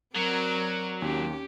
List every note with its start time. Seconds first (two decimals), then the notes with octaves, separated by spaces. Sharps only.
0.15 F#3 C4 A#4 D5
1.02 D#2 C#4 G4